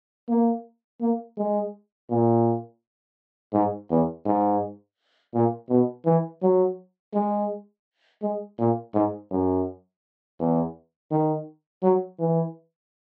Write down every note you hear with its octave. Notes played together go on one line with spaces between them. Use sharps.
A#3
A#3
G#3
A#2
G#2
E2
G#2
A#2
B2
E3
F#3
G#3
G#3
A#2
G#2
F#2
E2
D#3
F#3
E3